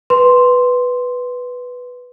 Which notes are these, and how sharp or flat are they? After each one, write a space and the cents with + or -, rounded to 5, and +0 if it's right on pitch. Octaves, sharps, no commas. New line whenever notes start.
B4 +0 C6 +0